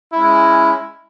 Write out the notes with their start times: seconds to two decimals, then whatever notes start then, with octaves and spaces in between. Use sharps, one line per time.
0.13 G#3 C#4 E4